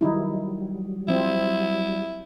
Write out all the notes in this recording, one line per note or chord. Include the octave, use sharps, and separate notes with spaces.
D#3 F#3 G3 D#4 E4
F3 C4 E4